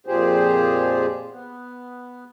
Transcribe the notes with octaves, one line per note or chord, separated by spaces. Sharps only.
F2 A#2 F3 G4 G#4 C5
B3